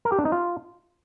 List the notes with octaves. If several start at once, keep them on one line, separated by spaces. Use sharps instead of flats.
A#4
G4
D4
D#4
F4